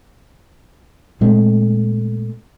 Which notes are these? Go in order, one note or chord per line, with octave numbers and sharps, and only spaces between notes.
A#2 G#3 A3 C4